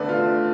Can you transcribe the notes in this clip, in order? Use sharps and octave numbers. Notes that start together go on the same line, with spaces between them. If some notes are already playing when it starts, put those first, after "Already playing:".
Already playing: E2 D3 A3 B4 D5
F4